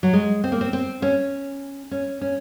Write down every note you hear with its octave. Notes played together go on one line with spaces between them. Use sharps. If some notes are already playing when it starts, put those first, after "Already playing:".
F#3
G#3
C4
A#3
C4
C4
C#4
C#4
C#4